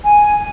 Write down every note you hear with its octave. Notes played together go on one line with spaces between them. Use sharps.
G#5